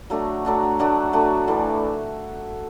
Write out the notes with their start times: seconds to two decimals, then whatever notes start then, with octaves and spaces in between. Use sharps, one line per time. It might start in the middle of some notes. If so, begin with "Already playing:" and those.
0.10 F#3 A3 D4 F#4
0.45 F#3 A3 D4 F#4
0.79 F#3 A3 D4 F#4
1.13 F#3 A3 D4 F#4
1.48 A2 E3 D4